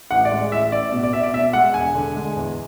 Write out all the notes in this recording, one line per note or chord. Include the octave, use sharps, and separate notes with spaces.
A1 F#5
D5
G#3
A1 E5
A1 D5
B2
D5
B2 E5
D5
B2 E5
G#3 F#5
E1 G#5
D3
G#3
E2